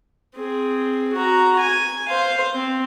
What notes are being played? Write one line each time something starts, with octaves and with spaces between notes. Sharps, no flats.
C4 G#4
F#4 A#5
G#5
C5 F5
C4